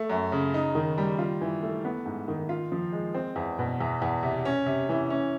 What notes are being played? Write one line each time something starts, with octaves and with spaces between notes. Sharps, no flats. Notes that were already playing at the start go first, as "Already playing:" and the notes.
Already playing: A3
F#2
C#3
D#4
D#3
G3
F4
E3
A3
B3
G#2
D#3
F4
F3
G#3
C4
E2
B2
E2
E2
C3
C#4
C3
E3
C#4